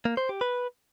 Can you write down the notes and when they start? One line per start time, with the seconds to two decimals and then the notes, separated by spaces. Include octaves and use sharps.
0.05 A#3
0.17 C5
0.29 G4
0.41 B4